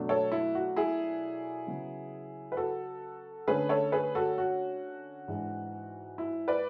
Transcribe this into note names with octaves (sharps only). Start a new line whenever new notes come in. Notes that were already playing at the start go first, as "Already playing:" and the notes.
Already playing: B2 F#3 A3 D4
A4 C#5
E4
F#4
E4 G#4
C#3 F#3 B3
B4
F#4 A4
D3 A3 C#4 G#4 B4
A4 C#5
G#4 B4
F#4 A4
F#4
G#2 E3 G#3 D4
E4
B4 D5